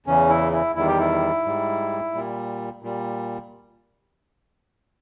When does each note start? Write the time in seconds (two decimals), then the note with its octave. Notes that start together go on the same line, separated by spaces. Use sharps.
0.06 E2 C#3 E3 C#4
0.29 E4
0.52 E4
0.75 E2 D#3 G3 E4
0.87 G4
0.99 E4
1.45 G#2 G3
2.14 A#2 G3
2.83 A#2 G3